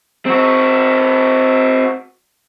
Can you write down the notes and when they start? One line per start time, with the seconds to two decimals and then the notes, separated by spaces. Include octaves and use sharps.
0.26 C4 F#4